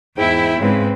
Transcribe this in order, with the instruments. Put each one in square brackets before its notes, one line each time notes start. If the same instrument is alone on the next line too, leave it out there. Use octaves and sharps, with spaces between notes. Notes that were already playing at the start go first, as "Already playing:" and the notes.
[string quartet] E2 G5 [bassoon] G#2 [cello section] E4
[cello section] G#2 G#3 [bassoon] C#3 [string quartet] C4 B4